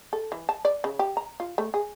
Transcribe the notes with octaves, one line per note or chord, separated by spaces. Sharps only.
A4
E3
A5
D5
C#3
G4
A#5
F4
A3
G#4